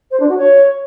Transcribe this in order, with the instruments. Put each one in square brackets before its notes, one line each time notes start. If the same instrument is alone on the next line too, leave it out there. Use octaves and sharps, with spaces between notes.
[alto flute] C5
D4
F#4
C#5